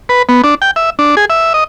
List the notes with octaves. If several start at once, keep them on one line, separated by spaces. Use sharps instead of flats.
B4
B3
D4
G5
E5
D4
G#4
E5
D#5